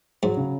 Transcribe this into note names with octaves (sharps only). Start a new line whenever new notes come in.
G#2 F#3
C#3